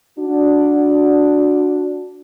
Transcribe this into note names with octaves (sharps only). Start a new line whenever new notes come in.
D4 F#4